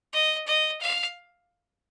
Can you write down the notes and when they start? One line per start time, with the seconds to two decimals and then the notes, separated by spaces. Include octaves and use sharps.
0.13 D#5
0.47 D#5
0.81 F5